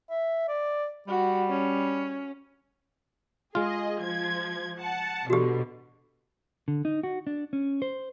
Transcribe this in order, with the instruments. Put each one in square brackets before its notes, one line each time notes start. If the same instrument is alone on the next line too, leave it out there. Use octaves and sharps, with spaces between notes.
[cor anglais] E5
D5
[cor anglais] G3 [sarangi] F#4
[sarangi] C#4
[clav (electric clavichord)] G#3 F4 [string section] G#4 D#5
[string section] F3 G#6
F#5 A5
[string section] B2 D3 [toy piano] F#4 G4
[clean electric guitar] D3
D#4
F#4
D4
C#4
C5